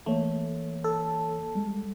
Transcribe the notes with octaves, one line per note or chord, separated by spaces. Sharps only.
E3 A3 A#3 C#5
A4
G3 G#3